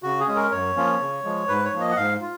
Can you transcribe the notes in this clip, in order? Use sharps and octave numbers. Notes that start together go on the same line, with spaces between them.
C#3 F#4
G#4
G#3 C#4
A#4
F#2 C#5
F3 A#3 C#4 F4
C#3
F3 G#3
G#2 B4
C#5
F3 A#3
D#5
F#5
G#2 F5
F4